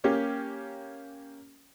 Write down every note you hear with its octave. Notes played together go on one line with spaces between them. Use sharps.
A#3 C#4 G4